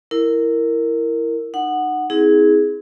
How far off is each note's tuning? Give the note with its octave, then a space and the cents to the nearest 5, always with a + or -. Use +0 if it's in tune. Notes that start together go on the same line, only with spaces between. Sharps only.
E4 +5 A#4 -10
D#4 -30 F#5 +0
C4 +0 E4 -40 G#4 +0